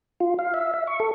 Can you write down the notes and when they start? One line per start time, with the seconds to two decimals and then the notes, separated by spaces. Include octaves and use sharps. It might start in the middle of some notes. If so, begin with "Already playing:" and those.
0.20 F4
0.39 F5
0.54 E5
0.74 E5
0.87 C#6
1.00 A4